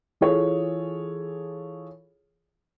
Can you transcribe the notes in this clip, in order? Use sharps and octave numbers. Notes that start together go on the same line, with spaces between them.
E3 F4 G#4 A4 C#5